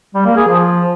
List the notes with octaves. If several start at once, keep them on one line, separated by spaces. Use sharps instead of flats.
G3
A#3
G#4
F3